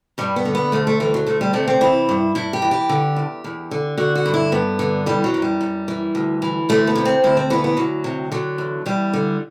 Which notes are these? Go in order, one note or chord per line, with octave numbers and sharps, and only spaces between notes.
G2 G3
B3
D3
B3
D2 A3
A3
E3 G3
F#3
D2 A3
G3
C3 A3
C4
E3 E4
G2
G2 E4
G4
E3
G4
D3
E2
E2
D3
D3 F#4
F#4
G2
E4
G2 B3
D3
E3 G3
F#3
F#2
G3
F#2
E3
D2
E3
D2 A3
B3
C3
C4
D2 E4
C4
E3 B3
B3
D2 F#3
C3
D3 F#3
E2
E2 G3
D3